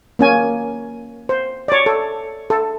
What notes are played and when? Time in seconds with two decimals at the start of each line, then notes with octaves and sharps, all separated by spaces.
0.19 A#3 C#4 G#5
1.29 C5
1.68 C#5 D5
1.86 A4
2.50 A4